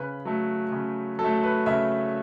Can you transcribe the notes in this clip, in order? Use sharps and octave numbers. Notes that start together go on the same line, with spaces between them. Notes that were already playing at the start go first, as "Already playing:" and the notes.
Already playing: C#3 B4
F#3 A3
C#3
F#3 A4
A3
B4
C#3 E5